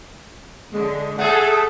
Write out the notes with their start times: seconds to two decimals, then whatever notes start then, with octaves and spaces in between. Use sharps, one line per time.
0.73 D3 G#3
1.19 A3 G#4 A4 F#5